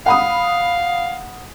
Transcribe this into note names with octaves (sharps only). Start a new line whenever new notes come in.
F5 F#5 B5 D#6